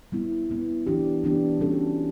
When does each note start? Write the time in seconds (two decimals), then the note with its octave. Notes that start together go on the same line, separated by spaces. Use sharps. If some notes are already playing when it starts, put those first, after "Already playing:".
0.12 G3 B3 E4
0.50 G3 B3 E4
0.87 E3 B3 D4 G4
1.24 E3 B3 D4 G4
1.60 E3 G3 C#4 F#4 A4